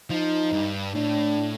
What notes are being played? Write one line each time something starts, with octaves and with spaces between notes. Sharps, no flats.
F3 D#4
G2
A2 D4